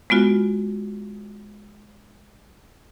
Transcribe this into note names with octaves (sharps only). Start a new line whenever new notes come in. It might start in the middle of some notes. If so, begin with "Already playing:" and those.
G#3 B3 F4 F#4